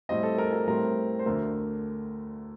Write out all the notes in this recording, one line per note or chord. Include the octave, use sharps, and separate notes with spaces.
A2 G3 C4 D#5
A4
A#4
A#4
A2 G3 C4 A#4
C5
D2 D3 A3 A#4